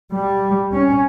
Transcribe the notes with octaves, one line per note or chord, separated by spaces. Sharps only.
G3
C#4